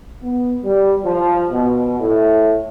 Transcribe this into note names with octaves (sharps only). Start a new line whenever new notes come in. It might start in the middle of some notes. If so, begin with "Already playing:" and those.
B3
G3
F3
B2
A2